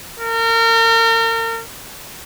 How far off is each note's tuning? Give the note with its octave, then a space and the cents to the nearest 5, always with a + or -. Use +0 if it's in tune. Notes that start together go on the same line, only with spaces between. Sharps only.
A#4 -35